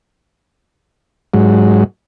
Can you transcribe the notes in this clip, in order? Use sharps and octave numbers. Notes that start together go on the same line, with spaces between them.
G#2 F#3